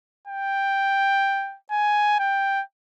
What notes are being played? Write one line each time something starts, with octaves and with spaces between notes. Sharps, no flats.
G5
G#5
G5